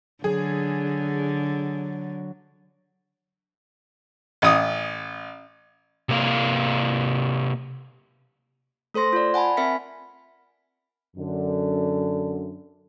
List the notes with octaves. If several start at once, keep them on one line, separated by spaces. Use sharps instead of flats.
D3 F#3 G#4
A1 D#6
C3 A#3 F5
A3 A4 C5 C6 A#6
F4 D5
F#5 G#5 A5 B5
C4 A#4 E5 G#5 B6 C#7
F#2 D3